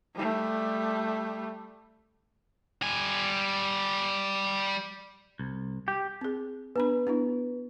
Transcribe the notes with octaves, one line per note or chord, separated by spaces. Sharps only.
G3 A3
G3 G#5
C2
G4
C4 G#4
B3 D4 B4 B5
B3 D4 E4